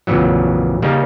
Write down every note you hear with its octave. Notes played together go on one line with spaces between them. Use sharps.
A#1 F2 A#2 C#3 E3 F#3
C#3 G3 A#3 C#4 D#4